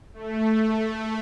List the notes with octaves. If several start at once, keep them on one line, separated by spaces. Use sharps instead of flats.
A3